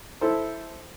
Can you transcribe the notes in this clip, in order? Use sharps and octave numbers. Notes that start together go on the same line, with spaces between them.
E4 A4 C5